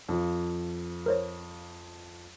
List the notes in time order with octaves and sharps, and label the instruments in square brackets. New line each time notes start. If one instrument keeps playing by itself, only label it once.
[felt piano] F2 F3
[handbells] A#4 C5 C#5